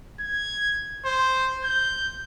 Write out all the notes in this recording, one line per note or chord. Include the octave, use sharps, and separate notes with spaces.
G#6
C5
G6